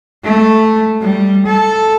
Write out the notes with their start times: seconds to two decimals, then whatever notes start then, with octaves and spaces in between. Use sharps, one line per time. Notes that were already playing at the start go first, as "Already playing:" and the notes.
0.24 A3
1.01 G3
1.46 A4